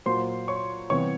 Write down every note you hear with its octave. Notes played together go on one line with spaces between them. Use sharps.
A#2 F#3 A#3 C5 C6
C#5 C#6
C3 E3 G3 B3 C#5 C#6